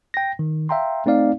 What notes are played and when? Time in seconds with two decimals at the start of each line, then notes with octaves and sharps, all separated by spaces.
0.14 G5 A#6
0.39 D#3
0.69 E5 F5 G5 A#5 C6
1.06 A3 C4 D#4 D5 F5